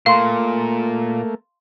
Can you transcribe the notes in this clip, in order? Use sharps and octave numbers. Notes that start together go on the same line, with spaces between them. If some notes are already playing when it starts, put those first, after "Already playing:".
A#2 A3 A#3 F5 C6 C#6